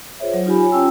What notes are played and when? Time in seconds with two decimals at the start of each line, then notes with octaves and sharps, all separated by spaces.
0.20 F4 G#4 C5 C#5 E5
0.34 F#3
0.46 D#4 F4 G4 G#5 B5
0.59 C#5 G#5
0.72 C#4 F4 G5 A5 E6